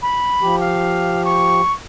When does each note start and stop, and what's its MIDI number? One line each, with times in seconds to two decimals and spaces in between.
0.02 0.56 83
0.42 1.61 53
0.42 1.61 67
0.60 1.23 77
1.25 1.73 85